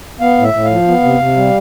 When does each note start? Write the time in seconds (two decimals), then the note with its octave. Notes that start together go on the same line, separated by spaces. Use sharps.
0.20 B3 F5
0.38 A2
0.43 E5
0.53 A2
0.65 F5
0.70 F3
0.87 B3
1.03 C3
1.19 C3
1.37 G3